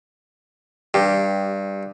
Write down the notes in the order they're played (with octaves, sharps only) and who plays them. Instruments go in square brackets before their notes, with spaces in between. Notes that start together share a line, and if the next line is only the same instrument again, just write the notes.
[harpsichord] G2 [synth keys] G4